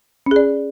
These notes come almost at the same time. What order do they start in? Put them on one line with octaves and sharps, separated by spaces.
C#4 G#4 D5